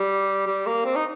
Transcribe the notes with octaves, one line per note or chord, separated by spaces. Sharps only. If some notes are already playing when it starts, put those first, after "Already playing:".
Already playing: G3
G3
A#3
C4
D#4